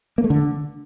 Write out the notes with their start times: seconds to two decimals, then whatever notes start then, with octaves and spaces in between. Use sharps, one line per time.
0.18 A#3
0.24 A3
0.30 D3